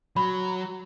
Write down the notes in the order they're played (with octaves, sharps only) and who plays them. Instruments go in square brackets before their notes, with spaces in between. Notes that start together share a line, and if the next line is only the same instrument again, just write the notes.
[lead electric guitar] F#3 [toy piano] B5